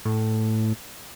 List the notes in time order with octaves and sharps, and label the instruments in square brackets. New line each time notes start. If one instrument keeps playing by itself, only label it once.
[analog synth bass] A2